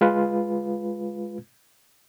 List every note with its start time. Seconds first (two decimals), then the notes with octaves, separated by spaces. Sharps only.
0.01 G#3 F4 B4